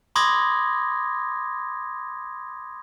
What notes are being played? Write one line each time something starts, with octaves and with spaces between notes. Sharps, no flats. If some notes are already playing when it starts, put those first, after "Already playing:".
B5 C6 D6 D#6 G#6 A#6